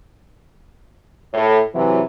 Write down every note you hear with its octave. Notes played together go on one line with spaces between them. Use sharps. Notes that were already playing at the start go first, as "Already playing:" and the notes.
A2
C3 E3 F#3